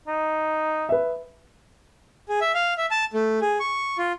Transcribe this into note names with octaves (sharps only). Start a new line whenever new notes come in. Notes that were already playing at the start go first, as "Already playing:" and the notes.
D#4
B4 E5
G#4
E5
F5
E5
A5
A3
G#4
C#6
F4